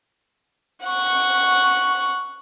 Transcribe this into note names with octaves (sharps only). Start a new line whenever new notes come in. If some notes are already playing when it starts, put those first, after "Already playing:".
F#5 C#6